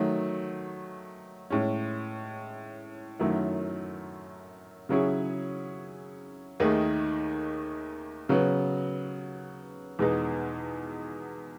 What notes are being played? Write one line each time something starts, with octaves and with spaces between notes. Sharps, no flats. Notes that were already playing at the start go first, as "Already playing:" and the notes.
Already playing: D#3 F#3 A3
A2 G#3 C#4
F#2 D#3 F#3 A3 E4
C#3 F#3 C#4 E4 G#4
D#2 D#3 A3 D#4 G#4
C#3 F#3 B3
E2 B2 G#3 B3 D#4